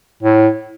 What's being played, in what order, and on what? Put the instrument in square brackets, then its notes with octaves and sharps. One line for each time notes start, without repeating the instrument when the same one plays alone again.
[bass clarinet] A2